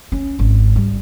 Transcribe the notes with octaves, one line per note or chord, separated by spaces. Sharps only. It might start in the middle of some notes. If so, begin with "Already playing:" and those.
C#4
G#1
G3